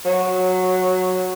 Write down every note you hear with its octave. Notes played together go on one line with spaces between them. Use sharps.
F#3